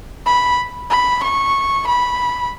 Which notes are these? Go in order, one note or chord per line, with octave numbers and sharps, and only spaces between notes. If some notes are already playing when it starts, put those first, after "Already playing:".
B5
B5
C#6
B5